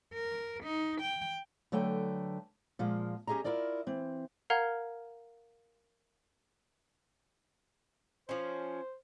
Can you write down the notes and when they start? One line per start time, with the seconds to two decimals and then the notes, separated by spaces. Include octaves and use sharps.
0.14 A#4
0.63 D#4
1.01 G5
1.72 D3 F#3 A3 B4 G5
2.79 A#2 F3 G#3 F4
3.27 C#4 G4 G#4 D#5 A#5
3.44 E4 F4 A#4 D5 D#5
3.87 E3 C4
4.50 A#4 F5 F#5 A#5 F6 G#6
8.29 F3 C#4 C5